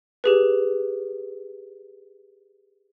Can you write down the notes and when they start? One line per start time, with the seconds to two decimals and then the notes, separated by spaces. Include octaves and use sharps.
0.24 G4 G#4 B4